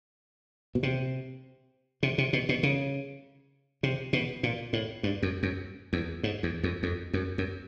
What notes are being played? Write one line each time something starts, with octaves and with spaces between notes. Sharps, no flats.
B2
C3
C3
C3
B2
B2
C#3
C3
B2
A#2
A2
G2
F#2
F#2
E2
G#2
E2
F2
F2
F#2
F#2